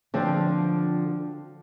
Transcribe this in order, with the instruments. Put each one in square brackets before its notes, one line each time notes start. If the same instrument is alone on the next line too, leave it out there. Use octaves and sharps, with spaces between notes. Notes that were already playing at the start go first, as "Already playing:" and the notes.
[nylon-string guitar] D3 F3 C4